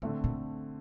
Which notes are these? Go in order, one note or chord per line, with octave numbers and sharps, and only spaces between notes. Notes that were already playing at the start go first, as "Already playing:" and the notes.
A2 D3 A3 C4
A#2